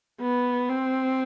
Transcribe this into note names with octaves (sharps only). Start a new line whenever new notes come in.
B3
C4